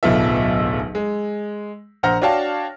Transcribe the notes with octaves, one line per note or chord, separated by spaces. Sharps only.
D1 B1 B3 F4 A4 E5
G#3
A#1 C5 F#5 A#5 F6 A#6
D4 F#4 C#5 F5 G5 A5